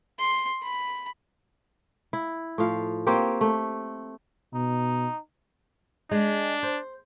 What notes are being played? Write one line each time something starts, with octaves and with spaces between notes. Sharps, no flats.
C6
B5
E4
A2 F3 F5
A#3 C4 G4 C#5
A3
B2 D#4
G#3 D4
C5